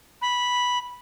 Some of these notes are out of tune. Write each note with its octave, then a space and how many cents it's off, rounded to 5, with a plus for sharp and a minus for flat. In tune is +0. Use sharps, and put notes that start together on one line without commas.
B5 -10